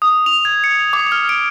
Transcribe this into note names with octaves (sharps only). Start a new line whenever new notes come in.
D#6
F7
G#6
C#7
D6
F6
D7